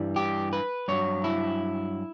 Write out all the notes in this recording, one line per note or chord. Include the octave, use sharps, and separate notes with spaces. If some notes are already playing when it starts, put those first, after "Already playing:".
Already playing: G2 E3 G3
G4
B4
G2 F#3 C#5
E4